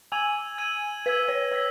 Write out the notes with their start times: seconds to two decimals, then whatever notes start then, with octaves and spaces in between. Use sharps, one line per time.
0.12 G#5 E6 G#6 D#7 F#7
0.58 E6 G#6 D#7 F#7
1.05 B4 E6 G#6 B6 F#7
1.28 C#5
1.52 C#5 E6 G#6 B6